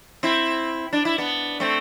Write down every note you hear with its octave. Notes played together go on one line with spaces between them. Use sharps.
C4 E4
D4
E4
B3 D4
A3 C4